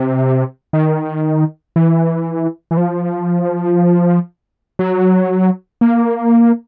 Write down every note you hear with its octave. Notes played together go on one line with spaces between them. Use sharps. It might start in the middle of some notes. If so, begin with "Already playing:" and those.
Already playing: C3
D#3
E3
E3
F3
F#3
A#3